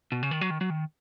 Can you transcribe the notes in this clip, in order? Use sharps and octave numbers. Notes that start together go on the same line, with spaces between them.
B2
C#3
D#3
F#3
D#3
F#3
D#3